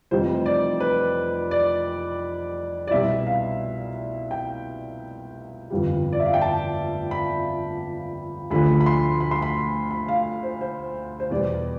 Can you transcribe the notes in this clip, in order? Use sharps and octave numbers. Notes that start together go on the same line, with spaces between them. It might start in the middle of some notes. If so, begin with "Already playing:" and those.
F1 F2 E3 G3 C5
D5
B4
D5
D5
C2 B2 G3 E5
F5
G5
G1 F2 E3 G3
D5
E5
F5
G5
A5
B5
D2 D3 F3 B5
B5
C6
B5
C6
B5
B5
F5
C5
C5
C5
E2 B2 G3 D5